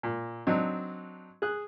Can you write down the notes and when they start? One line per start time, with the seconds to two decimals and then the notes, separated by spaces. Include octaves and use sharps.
0.03 A#2
0.47 F#3 C4 D4 D#4
1.42 G#4 F#6